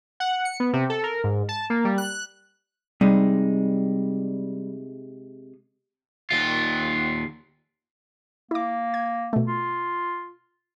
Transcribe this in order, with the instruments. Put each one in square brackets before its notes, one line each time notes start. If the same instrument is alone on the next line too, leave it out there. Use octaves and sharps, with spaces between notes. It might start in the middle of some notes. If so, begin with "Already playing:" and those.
[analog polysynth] F#5
C#7
B3
C3
A4
A#4
G#2
A5
A#3
G3
F#6
[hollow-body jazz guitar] C3 G#3 D#4 [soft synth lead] G3
[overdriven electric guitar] D#2 F4
[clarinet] A#3 [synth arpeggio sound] E4 D6
[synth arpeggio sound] G#6
B2 A3
[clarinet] F4